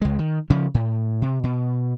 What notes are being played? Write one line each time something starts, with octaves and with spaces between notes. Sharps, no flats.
C#2 G#3
D#3
C#3 F3 C#4
A2
C3
B2